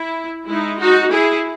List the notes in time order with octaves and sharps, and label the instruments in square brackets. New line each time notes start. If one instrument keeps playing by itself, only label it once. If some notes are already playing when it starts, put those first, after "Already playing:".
Already playing: [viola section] E4
G#3 D#4 E4
D#4 F#4
E4 G#4